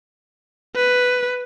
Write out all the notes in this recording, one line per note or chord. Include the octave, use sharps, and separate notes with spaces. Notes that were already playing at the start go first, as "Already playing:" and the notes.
B4